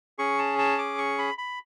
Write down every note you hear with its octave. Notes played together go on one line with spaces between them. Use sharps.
C#4 G#4 C#6
A5
A5
D6
C#6
B5
B5